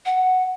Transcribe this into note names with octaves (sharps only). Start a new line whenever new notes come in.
F#5